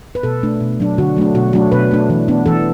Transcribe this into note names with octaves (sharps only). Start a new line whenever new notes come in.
B4
B2 A4
A3 D4
B2
F#3 D4
D3 F#4
F#3 A3 D4
B2 F#4
F#3 A3 D4 F#4
B2 B4
A3 D4
E3
B3 D4
E3 A4